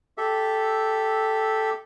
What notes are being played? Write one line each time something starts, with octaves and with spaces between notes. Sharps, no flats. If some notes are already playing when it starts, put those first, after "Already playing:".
G4 A4 E5